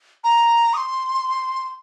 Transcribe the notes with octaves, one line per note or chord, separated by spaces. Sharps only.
A#5
D#6
C6